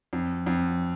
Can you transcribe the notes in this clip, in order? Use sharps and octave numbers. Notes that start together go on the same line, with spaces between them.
F2
F2